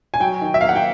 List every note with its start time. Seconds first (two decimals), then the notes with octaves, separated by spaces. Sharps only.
0.14 G#5
0.20 F#3 G5
0.41 D#3
0.54 E5
0.61 A#3 F5
0.69 F#5
0.76 G5